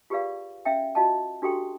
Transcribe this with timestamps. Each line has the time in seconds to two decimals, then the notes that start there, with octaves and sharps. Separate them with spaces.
0.10 F4 G4 G#4 B4 D5 F5
0.65 C#4 E5 F5 G5
0.95 F4 F#4 D#5 F5 A5
1.42 D4 F#4 G4 A4 G5 C6